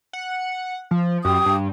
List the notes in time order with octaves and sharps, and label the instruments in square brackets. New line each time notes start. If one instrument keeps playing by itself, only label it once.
[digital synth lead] F#5
F3
[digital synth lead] F#2 [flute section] G4 G5 D#6
[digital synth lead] G2